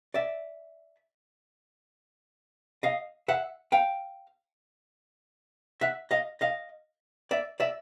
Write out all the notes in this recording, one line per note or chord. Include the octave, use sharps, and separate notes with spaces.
D5 E5
D#5 F5
E5 F#5
F5 G5
E5 F#5
D#5 F5
D#5 F5
D5 E5
D5 E5